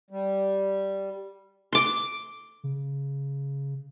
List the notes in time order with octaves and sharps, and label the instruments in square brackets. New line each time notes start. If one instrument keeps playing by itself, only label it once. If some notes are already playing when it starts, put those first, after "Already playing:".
[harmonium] G3
[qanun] C6 D6
[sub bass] C#3